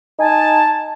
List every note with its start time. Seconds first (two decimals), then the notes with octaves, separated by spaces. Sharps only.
0.19 D#4 G#5 A5